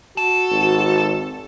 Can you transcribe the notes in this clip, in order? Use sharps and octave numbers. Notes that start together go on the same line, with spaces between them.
F#4 A4
G#1